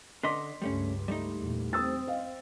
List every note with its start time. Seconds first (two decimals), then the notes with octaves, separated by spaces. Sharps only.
0.23 D3 D4 D#5 C6 D6 B6
0.62 C#2 G2 G3 A3 C#4
1.08 G3 A3 D#4
1.39 E2 A#2
1.73 C4 D#6 E6 A6
2.07 D#5 F5